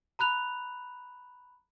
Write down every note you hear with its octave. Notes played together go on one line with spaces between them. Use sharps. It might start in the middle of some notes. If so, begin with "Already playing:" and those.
A#5 B5 F#6 F7